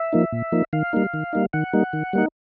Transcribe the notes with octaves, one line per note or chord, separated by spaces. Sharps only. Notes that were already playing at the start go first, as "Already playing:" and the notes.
Already playing: E5
F3 A#3 D#4
A#2
F3 A#3 D#4
D#3 F5
G3 A#3 D#4
D#3
G3 A#3 D#4
D#3 F#5
G3 A#3 D#4
D#3
G3 A#3 D#4